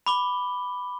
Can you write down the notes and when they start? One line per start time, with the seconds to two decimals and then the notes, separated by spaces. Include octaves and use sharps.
0.06 B5 D6 G7